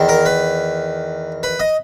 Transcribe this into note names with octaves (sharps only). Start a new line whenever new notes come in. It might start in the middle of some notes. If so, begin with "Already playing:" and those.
Already playing: E2 D#3
A#4
B4
B4
D#5